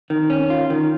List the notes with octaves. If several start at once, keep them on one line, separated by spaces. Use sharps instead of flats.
D#3
C#4
F4
D#3